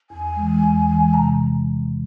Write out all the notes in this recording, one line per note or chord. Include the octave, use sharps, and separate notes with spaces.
E2 G#5
E3 G#3
E2
E3 G#3
C3 A#5